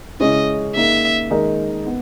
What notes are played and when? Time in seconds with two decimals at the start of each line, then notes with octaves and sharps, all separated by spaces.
0.20 C#3 G#3 C#4 E4 D#5
0.76 A#3 D#4 G#4 E5
1.31 D#3 G#3 D#4 A#4 D#5
1.86 B3